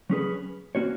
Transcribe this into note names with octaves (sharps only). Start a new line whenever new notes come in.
F#3 C#4 G#4 B4
A#3 C#4 F#4 C#5